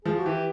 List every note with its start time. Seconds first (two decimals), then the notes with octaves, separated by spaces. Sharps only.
0.05 F3 G#4
0.19 F#4
0.25 E3 G4